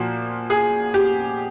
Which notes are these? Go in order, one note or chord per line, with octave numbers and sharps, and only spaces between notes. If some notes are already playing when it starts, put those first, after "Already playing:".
Already playing: A#2 F3 A#3 F#4
G#4
G4